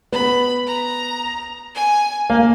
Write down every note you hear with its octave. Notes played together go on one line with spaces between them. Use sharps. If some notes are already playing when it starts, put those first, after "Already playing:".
B3 B5
A#5
G#5
A#3